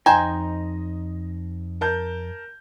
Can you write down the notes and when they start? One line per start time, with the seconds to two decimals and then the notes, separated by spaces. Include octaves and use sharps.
0.06 F2 C#3 D#4 C5 D#5 G5 G#5 A#5
1.81 A#4 A5 G6